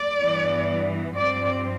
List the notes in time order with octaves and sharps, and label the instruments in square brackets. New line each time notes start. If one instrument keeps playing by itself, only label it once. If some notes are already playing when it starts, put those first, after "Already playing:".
Already playing: [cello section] D5
G2 E3 B3
G2 F3 C4 D5